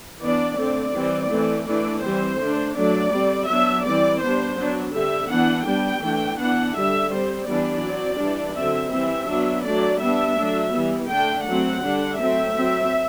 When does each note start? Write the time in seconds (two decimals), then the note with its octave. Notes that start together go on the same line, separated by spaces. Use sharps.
0.21 E3 B3 D4 D5
0.58 D3 A3 C4 D5
0.95 E3 G3 C4
1.31 E3 A3 C4
1.67 E3 A3 D4 D5
2.03 E3 G3 C4 C5
2.39 D3 A3 D4
2.75 F#3 A3 D4 D5
3.12 G3 C4
3.48 F#3 B3 D4 E5
3.85 E3 G3 C4 D5
4.21 G3 B3 D4 C5
4.57 F#3 B3 D4
4.93 D3 G3 C4 E5
5.30 E3 B3 D4 F#5
5.66 G3 B3 D4 G5
6.02 E3 A3 D4
6.38 E3 B3 D4 F#5
6.75 D3 G3 D4 E5
7.11 G3 C4 C5
7.47 E3 G3 B3 D4 D5
7.83 F#3 C4
8.20 E3 G3 D4
8.56 D3 F#3 C4 E5
8.92 E3 G3 C4 E5
9.29 F#3 B3 D4
9.65 F#3 A3 D4 D5
10.01 G3 B3 D4 E5
10.37 F#3 A3 D4
10.74 E3 G3 B3
11.10 D3 A3 D4 G5
11.46 F#3 A3 C4 F#5
11.82 D3 G3 D4
12.19 F#3 A3 C4 E5
12.56 F#3 C4